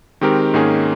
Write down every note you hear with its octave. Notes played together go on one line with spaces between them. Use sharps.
D#3 G#3 C4 G4 A#4
G#2 D#3 A#3 C#4 G#4